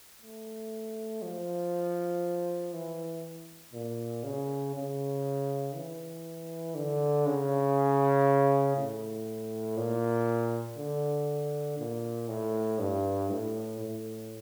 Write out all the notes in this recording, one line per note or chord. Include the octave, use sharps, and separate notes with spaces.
A3
F3
E3
A#2
C#3
C#3
E3
D3
C#3
A2
A#2
D3
A#2
A2
G2
A2
A2